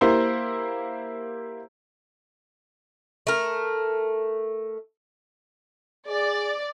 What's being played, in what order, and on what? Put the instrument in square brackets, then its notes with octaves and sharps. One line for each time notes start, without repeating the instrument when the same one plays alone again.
[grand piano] A#3 E4 G4 C5
[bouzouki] A3 A#4
[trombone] G#4 [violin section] D5